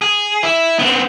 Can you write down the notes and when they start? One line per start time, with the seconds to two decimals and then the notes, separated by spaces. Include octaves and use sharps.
0.02 G#4
0.43 E4
0.79 B3 C4